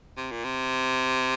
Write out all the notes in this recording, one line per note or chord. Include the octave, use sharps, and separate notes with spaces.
C3
A#2
C3